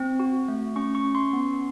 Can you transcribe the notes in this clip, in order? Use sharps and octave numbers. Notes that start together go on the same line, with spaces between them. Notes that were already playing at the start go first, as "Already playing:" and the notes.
Already playing: C4
F#4
A3
C#4 C#6
C#6
C#4
C6
B3